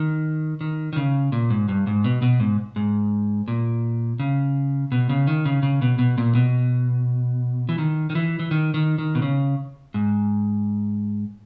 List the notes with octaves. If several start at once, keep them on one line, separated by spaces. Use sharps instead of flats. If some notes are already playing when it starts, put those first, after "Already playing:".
Already playing: D#3
D#3
D#3
C#3
A#2
G#2
G2
G#2
B2
B2
G#2
G#2
A#2
C#3
B2
C#3
D#3
C#3
C#3
B2
B2
A#2
B2
E3
D#3
D#3
E3
E3
D#3
D#3
D#3
B2
C#3
G#2